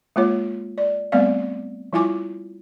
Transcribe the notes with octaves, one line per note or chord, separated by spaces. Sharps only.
G#3 A#3 F4 C#5
D5
G3 A3 B3 C4 D5 F5
F3 G3 E4 F4 G#5 D6